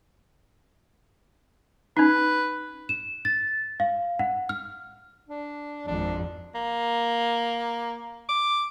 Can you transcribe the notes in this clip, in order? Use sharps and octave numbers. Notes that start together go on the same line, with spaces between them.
C#4 D#4 B4
E7
A6
F5
F#5
F6
D4
G#1 F2 D4
A#3
D6